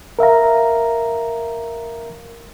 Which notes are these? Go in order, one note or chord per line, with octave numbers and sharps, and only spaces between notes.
A#4 E5 F5 A#5